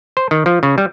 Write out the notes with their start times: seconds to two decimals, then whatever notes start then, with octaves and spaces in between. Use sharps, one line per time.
0.17 C5
0.31 D#3
0.46 F3
0.63 C#3
0.78 G3